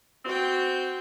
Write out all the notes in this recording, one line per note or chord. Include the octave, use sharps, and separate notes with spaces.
C4 F#4 G5